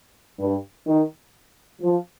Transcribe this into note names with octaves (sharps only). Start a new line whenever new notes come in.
G2
D#3
F3